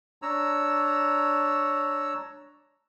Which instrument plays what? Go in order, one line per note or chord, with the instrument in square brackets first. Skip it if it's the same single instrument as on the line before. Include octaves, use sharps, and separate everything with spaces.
[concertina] D4 C#5 A#5 E6